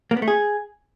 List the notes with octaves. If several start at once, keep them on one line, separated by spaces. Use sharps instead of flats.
A#3
B3
A3
G#4